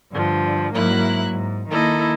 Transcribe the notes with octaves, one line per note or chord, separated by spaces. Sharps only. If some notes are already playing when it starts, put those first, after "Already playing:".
G2 D3 F3
G#2 F#3 A#3 E4 F#6
G#2
D#3 A#3 E4 A4 D#5